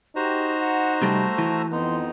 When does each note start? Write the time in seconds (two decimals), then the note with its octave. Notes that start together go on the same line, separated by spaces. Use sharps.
0.16 D#4 F#4 G4 C5 A#5
0.59 F#5
1.02 C3 G3 A3 C4
1.38 E3
1.72 F2 B3 D#4 C6